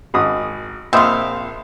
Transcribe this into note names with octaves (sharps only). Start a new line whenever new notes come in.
G#1 D#6
A#1 C4 F4 E5 D#6